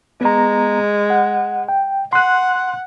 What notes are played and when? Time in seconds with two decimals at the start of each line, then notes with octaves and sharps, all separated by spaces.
0.21 G#3 B3 A#5
1.10 F#5
1.68 G5
2.13 F#5 C6 F#6